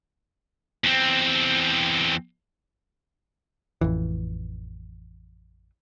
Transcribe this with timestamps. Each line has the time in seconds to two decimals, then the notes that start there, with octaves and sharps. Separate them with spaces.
0.84 E2 C4
3.81 A1 F2 E3